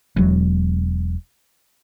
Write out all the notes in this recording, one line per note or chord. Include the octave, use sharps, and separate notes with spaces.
E1 F#3